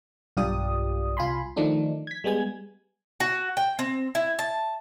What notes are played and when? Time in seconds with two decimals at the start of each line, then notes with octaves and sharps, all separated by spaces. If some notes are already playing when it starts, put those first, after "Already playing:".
0.37 B1 G2 F4 G4 D5 D#6
1.17 C2 F4 G#5 B5 C6
1.56 D#3 F3 A3 D4 D#4
2.07 G#6 B6
2.24 G3 G#3 B3 G#5 G#6
3.20 F#4
3.57 G5
3.79 C4
4.15 E4
4.39 A5